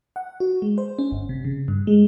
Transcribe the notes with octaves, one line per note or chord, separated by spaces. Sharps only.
F#5
F#4
G#3
C5
C#4
G1
C3
C#3
G2
G#3